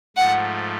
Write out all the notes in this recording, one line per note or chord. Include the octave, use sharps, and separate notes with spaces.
G#2 F3 A3 F#5